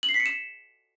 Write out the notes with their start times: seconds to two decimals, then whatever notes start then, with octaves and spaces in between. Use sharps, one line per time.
0.03 F#7
0.09 C7
0.14 B6
0.20 C#7
0.26 E7